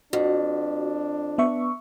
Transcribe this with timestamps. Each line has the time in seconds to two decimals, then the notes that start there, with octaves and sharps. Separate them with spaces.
0.13 F2 D4 F#4
1.38 B3 E5 C#6